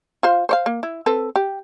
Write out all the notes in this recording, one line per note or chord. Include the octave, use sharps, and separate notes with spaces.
F4 C5 F5
C5 C#5 F5
A#3
E4
C4 A4 B4
G4